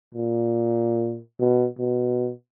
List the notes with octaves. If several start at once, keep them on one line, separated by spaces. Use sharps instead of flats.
A#2
B2
B2